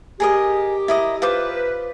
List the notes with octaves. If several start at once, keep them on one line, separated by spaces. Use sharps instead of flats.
G4 G#4 A#4 D#5
E4 A#4 D#5
F4 B4 C5 D6